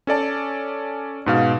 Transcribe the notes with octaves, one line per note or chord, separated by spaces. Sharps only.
C#4 A4 D5 A5
G#2 B2 F5